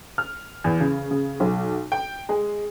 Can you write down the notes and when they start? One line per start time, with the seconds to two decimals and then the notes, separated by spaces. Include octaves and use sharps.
0.18 F6
0.64 E2
0.80 C#3
1.11 C#3
1.40 B1
1.92 G5
2.29 G#3